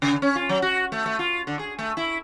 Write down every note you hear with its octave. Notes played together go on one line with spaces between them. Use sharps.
C#3
C#4
F4
F#3
F#4
A3
A3
F4
D3
G#4
A3
E4